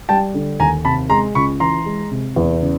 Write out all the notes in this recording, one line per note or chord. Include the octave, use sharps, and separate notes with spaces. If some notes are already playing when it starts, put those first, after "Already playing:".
G3 G5 A5
D3
D#2 G#5 A#5
C3 A5 B5
G#3 A#5 C6
C#2 B5 C#6
E3 A#5 C6
G#3
C3
E2
C#3